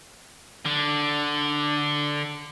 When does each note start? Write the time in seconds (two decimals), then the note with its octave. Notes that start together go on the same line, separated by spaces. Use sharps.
0.66 D3